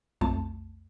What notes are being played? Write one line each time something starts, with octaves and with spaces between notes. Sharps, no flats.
B1 F2 A3 A5